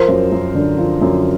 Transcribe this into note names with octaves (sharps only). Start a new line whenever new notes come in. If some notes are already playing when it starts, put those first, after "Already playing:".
Already playing: F3 A#4 C5
F#2
F#2
D3
F3
F#2